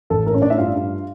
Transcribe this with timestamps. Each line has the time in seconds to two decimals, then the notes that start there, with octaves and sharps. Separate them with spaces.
0.10 A1 A4
0.26 A2 A#4
0.34 C#4 C#5
0.42 A2 D4 D5
0.50 E4 E5
0.58 G2 F4 F5
0.75 G2